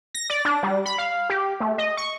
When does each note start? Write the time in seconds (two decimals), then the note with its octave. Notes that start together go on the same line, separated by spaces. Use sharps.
0.14 A#6
0.30 D5
0.45 D4
0.63 G3
0.86 B5
0.98 F5
1.30 G4
1.60 A3
1.78 D#5
1.97 C#6